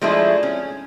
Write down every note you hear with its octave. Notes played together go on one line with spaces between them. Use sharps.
F3 G#3 A3 D4 E4 G#4
C#4